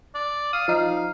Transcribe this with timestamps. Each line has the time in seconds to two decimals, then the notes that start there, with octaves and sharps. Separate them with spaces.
0.15 D5
0.53 F5 D#6
0.68 F3 D#4 F5